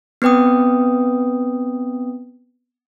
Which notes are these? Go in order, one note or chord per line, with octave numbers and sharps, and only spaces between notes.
B3 C4 B4 G5 D#6